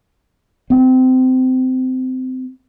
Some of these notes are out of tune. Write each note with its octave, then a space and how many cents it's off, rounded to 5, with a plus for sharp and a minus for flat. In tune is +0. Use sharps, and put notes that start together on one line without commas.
C4 -25